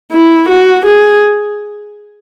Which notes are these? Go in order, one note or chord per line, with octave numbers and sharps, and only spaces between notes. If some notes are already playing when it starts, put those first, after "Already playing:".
E4
F#4
G#4